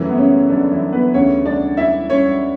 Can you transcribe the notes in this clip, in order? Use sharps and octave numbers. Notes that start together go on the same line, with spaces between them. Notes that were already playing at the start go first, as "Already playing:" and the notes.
Already playing: F#2 E3 A3
B3
C#3 C#4
D3 D4
E3 E4
B3 B4
D2 C#3 E3 C#4 C#5
D4 D5
E4 E5
C#4 C#5